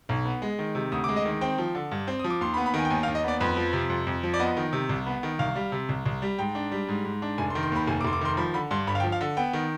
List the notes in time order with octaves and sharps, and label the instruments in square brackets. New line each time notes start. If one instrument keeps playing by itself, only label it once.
[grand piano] B1
B3
G#3
D#3
C3
D2 D#6
D6
G#3
D#5
D#3
C4 G5
F3
D3
G2
C4
F3 D#6
D6
D#2 C6
B5
B3
B5
D#3 G#5
G5
D#2 G#5
F5
D#2
D#5
B3 D5
F2 B4
F3
C3
F2
F2
F3
D5
B3 D#5
D#3
C3
C2
B3
D#3
C2 F5
G3
C3
C2
C2
G3
G#2 G5
D4
G3
G#2
G#2
D4
F1 G#5
C6
D#3
C6
D#2 B5
F1 G#5
D6
F1 C6
D6
D#3 C6
F3 B5
D3 B5
G2 C6
G1 B5
F5
G5
F3
F5
D3
B3 G5
D#3